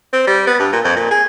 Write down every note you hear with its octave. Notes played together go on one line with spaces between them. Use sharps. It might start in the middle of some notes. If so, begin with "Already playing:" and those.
C4
G3
B3
G2
A#2
F2
A#2
G#4